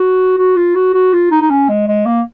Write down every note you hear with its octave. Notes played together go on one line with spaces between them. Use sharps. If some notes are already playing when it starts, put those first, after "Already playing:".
Already playing: F#4
F#4
F4
F#4
F#4
F4
D#4
D#4
C#4
G#3
G#3
A#3